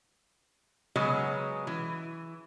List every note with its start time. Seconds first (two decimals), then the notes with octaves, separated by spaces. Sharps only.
0.96 C#3 F#3 G#3 B3
1.67 E3